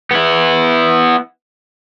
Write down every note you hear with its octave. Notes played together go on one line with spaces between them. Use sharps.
B3 E4